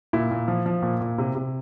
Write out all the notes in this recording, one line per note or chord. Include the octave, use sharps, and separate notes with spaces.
A#2 E4
A#2
F3
F3
A#2
A#2
C3
C3